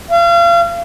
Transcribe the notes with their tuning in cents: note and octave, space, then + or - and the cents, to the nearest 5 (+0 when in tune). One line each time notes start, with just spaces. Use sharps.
F5 -35